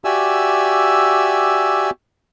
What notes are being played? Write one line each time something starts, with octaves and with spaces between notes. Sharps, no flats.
F#4 G4 D5 E5 G#5 E6